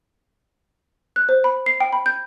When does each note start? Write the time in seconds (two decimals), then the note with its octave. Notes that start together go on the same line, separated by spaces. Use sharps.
1.16 F#6
1.29 C5
1.44 B5
1.66 C7
1.81 G5
1.93 B5
2.06 G6